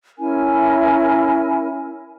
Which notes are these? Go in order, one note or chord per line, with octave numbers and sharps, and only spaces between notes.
C#4 E4 A#4 G#5